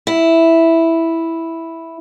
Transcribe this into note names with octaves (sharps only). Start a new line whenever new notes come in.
E4